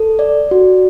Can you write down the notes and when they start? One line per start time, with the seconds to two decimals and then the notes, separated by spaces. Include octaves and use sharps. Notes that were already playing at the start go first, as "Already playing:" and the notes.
Already playing: A4
0.19 D5
0.51 F#4